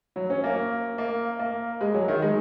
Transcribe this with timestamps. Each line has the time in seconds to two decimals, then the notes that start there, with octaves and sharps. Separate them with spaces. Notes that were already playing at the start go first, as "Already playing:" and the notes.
0.16 F#3
0.30 C#4
0.44 A#3
0.98 A#3
1.39 A#3
1.81 G#3
1.94 F#3
2.08 D#3
2.22 G#3